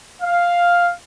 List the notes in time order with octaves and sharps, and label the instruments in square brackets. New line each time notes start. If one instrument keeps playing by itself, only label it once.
[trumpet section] F5